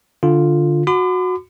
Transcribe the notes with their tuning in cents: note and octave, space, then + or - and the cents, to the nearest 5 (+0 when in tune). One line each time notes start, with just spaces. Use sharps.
D3 +0 F4 +0
F#4 -15 B5 +45 D6 +35